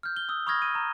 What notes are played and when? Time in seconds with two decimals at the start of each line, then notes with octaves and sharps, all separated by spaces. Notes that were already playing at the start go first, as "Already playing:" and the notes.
0.03 F6 G6
0.17 G7
0.29 D#6 E6
0.47 B5 C#6 D#6 F6 G#6 A#6
0.62 D#7
0.75 A#5